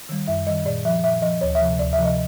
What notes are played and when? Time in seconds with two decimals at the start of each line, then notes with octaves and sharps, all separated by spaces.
0.09 D#3 G3
0.27 F#2 E5
0.47 D#3 G3 D#5
0.66 A#2 D5
0.85 F3 E5
1.04 A#2 E5
1.22 F3 D#5
1.41 D2 C#5
1.55 E5
1.61 C3 F3
1.79 D2 D5
1.93 E5
1.98 C3 F3
2.05 D#5